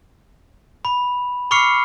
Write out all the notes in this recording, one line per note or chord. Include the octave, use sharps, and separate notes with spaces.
B5
B5 C#6 D6 F6 C7 C#7